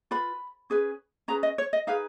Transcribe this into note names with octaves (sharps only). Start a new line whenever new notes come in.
F4 B4 B5
C#4 G#4 B4
C#4 G#4 B4 A#5
D#5
C#5
D#5
D#4 G#4 B4 F5